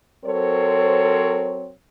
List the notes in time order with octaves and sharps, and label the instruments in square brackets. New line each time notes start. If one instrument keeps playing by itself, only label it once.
[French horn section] F#3 C4 A4 A#4 C5 C#5